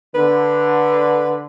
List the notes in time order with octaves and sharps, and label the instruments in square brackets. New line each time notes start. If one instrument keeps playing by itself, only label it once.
[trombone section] D3 [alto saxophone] B4